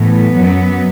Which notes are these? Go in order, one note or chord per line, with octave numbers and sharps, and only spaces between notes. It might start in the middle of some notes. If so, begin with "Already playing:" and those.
Already playing: A2 E3 B3
F#2 F#3